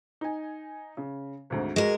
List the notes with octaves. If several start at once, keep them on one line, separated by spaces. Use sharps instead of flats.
D#4 G#5
C#3
G#1 D2 G#2
G#3 F#4 A#4